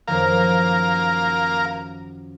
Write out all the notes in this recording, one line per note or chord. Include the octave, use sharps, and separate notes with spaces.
F#2 D#3 F3 A#4 F5